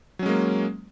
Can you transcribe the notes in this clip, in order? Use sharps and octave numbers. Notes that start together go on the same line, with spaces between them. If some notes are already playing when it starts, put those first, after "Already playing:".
F#3 G#3 A#3 C#4